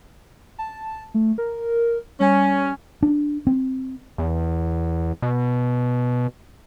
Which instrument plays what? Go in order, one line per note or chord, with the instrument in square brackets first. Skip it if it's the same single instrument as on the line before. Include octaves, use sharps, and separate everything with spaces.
[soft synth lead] A5
A3
A#4
[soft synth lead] G3 [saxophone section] C#4
[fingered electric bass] D4
C4
[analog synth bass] E2
B2